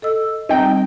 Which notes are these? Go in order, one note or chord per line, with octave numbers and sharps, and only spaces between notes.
A4 D#5 E6
G3 C4 D#4 G5